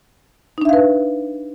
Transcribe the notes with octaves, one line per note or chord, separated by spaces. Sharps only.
D4 D#4 B4 E5 F5